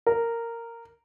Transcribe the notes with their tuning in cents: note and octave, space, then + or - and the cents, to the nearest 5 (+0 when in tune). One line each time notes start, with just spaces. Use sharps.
A#4 -10